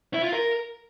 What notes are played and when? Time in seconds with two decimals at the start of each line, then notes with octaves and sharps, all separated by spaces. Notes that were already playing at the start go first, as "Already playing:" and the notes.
0.14 E4
0.23 F4
0.33 A#4